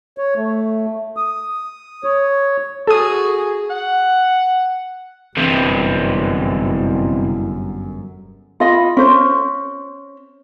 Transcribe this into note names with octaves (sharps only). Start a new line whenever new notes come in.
C#5
A3
D#6
C#5
F#4 G#4 A4 D#6
F#5
G1 F#2 C3 E3
F4 D#5 B5
C#4 C5